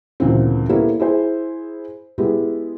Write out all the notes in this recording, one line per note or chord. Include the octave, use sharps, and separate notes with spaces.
D2 A#2 C#3 E3 A#3 C4
A#3 B3 E4 G4 A4 C#5
E4 G#4 C5
G#3 B3 E4 G4